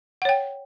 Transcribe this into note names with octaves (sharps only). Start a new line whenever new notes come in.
C#5 F#5 G5